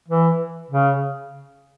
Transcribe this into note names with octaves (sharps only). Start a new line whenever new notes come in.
E3
C#3